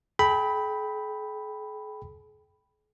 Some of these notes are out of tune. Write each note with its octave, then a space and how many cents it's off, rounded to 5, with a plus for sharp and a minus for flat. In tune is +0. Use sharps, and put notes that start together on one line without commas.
G#4 +45 G5 +0 B5 +0